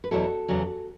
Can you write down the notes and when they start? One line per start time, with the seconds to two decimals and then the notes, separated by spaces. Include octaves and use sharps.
0.04 B4
0.11 E2 B2 F#3 C#4 E4 F#4 A4
0.48 E2 C#3 F#3